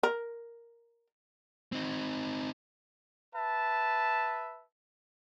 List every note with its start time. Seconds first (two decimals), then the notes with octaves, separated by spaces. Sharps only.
0.03 A#4
1.72 C4 D#4
3.34 B4 E5 A5